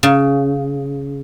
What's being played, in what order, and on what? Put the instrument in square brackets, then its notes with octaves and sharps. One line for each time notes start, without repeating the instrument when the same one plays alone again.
[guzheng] C#3